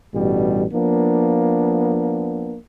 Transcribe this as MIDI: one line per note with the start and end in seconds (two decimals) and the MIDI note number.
0.14 0.65 33
0.14 0.65 43
0.14 0.65 47
0.14 0.65 55
0.73 2.56 53
0.73 2.56 58
0.73 2.56 59
0.73 2.56 62